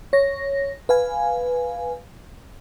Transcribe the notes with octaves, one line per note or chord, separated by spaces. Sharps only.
C#5 A#6
B4 F5 G#5